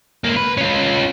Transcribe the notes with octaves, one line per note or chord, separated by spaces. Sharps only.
C#2 A#3
B4
C#4 F4